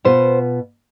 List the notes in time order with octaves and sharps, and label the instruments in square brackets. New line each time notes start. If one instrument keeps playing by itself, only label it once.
[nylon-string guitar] B2 B3 F4 C5